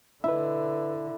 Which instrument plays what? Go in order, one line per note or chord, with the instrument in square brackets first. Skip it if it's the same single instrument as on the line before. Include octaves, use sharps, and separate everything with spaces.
[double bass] D3 [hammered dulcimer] E4 [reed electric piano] B4 E5